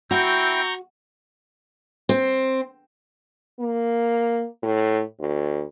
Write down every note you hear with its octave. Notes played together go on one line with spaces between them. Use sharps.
C4 E4 F#4 G5 A#5 C#6 G6
C4
A#3
A2
D2